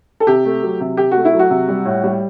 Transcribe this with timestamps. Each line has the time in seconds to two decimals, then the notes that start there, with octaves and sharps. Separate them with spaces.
0.20 A4
0.27 C3 G4
0.45 A3
0.63 F#3
0.80 C3
0.97 C3 G4
1.11 A3 F#4
1.25 E4
1.33 F#3
1.39 F#4
1.50 C3
1.68 G3
1.85 A2
2.04 G3